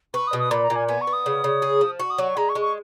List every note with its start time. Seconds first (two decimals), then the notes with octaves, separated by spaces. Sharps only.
0.14 B4 C#6
0.27 D#6
0.33 B2
0.39 D#6
0.51 A#2 B5
0.64 A#5
0.70 A#2
0.76 G#5
0.88 B3 G#5
1.01 C#6
1.07 B3
1.13 D#6
1.26 C#3
1.44 C#3
1.62 G#4
1.81 F3
1.99 F#4 C#6
2.10 D#6
2.18 F#3 C#6
2.37 G#3 A#5
2.49 C#6
2.55 G#3
2.61 C#6